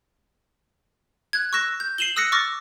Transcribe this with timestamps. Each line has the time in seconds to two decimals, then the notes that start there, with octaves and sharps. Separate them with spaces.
1.33 F#6 G#6
1.53 C#6 E6 F#6 A#6 E7
1.80 G6
1.98 C7 D#7 E7 F#7 G7
2.16 D#6 E6 F#6 A#6 C7 C#7
2.32 C#6 D6 E6 F6 A6 A#6